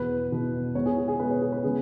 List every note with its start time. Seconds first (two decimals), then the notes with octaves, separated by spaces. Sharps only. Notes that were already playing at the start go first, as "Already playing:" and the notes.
Already playing: E2 B2 B3 B4
0.31 E2 B2 B3
0.75 B2 G#3 B3 C#5
0.86 G#4
0.98 G#4
1.08 G#4
1.19 B2 G#3 B3 B4
1.31 C#5
1.41 G#4
1.52 B4
1.63 C#3 G#3 B3 G#4